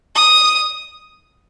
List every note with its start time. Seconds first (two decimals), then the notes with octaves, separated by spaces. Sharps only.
0.15 D#6